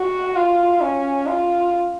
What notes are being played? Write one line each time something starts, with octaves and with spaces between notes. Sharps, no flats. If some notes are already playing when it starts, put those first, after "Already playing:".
Already playing: F#4
F4
C#4
F4